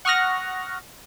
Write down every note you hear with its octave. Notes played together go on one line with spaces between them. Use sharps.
F#5 C#6 D#6 F6 F#6 A#6